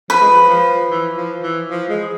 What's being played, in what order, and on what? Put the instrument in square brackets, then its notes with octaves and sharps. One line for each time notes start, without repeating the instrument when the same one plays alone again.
[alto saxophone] F3 [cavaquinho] B4
[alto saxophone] G#3
F3
F3
E3
F3
E3
F3
G#3